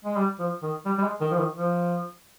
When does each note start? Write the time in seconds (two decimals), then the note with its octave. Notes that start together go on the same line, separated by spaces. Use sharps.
0.05 G#3
0.17 G3
0.39 F3
0.63 D#3
0.86 G3
0.98 G3
1.03 G#3
1.21 D#3
1.32 F3
1.38 D#3
1.55 F3